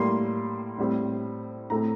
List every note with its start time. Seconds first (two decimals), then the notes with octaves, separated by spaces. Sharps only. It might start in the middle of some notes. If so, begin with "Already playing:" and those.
Already playing: A2 G3 A#3 C6
0.78 A2 G3 C4
1.70 A2 A3 C4 A#5